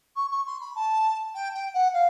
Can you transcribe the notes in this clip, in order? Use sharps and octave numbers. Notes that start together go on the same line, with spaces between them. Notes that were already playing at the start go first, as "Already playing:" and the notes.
C#6
C#6
C6
B5
A5
G5
G5
F#5
F5